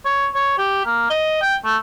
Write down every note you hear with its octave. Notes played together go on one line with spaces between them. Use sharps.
C#5
C#5
G4
A#3
D#5
G5
A3